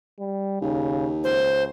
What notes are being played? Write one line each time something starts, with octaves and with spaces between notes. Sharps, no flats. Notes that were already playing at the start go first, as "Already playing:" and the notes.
G3
D#2 C#3
C#2 C5